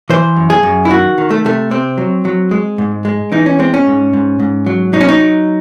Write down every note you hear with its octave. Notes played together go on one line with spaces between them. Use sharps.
E3 C5
F#2
G#4
F#2
E4
D#3 F#4
D#3
A3
C3 A3
C3 C4
F#3
F#3
G#3
G#2
G#3
E3 D#4
C#4
G#3 C4
C#4
G#2
G#2
G#2
F#3
F#3 D#4
C#4
D#4
F#3